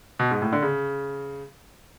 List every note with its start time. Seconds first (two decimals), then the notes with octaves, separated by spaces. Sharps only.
0.19 B2
0.31 G#2
0.42 A2
0.53 D3
0.63 C#3